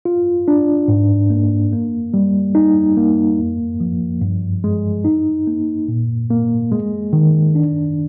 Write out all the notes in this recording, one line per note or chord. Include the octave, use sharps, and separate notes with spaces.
F4
D4
G#2
A#3
A#3
G3
D#4
A#3
F2
F3
G2
G#3
D#4
A#3
A#2
A#3
G#3
D#3
D4